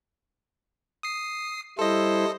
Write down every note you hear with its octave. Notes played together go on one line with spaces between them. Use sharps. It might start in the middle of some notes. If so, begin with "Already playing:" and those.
D#6 C7
G3 E4 A4 C5 D#5